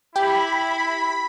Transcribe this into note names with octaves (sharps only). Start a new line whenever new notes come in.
E4 G4 B5